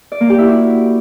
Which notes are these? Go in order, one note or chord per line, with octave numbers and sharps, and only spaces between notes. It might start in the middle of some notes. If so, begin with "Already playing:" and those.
D5
A#3
G4
E4
F#4